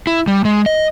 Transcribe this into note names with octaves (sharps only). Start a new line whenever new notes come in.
E4
G3
G#3
D#5